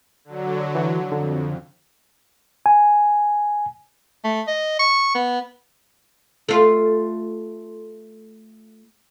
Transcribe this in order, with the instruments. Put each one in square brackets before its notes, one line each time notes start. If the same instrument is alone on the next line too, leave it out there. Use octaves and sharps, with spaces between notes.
[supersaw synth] D3 F#3
[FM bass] E3
[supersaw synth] F2 [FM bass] D3
[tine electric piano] G#5
[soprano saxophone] A3
D#5
C#6
B3
[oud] A3 F4